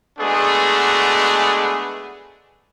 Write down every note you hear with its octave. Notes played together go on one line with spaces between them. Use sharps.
G#3 A3 B3 D4 F#4 G#4